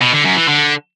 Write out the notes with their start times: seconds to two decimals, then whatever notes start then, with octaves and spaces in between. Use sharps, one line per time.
0.02 B2
0.13 D3
0.25 F#2
0.37 E3
0.48 D3